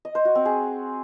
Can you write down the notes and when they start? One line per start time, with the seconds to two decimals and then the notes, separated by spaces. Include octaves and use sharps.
0.05 D#5
0.15 C5
0.25 F#4
0.35 C4
0.45 G#4